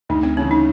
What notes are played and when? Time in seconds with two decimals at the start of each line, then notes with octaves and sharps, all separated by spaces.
0.09 D2 D#4
0.23 C4
0.37 C#3 E3 A3 C#4
0.51 D#4